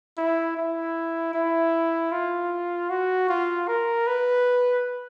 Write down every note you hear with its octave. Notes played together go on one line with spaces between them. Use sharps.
E4
E4
E4
F4
F#4
F4
A#4
B4